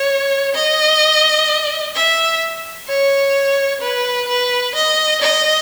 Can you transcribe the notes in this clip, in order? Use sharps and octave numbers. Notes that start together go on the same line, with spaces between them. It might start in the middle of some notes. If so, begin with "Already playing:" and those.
Already playing: C#5
D#5
E5
C#5
B4
B4
D#5
D#5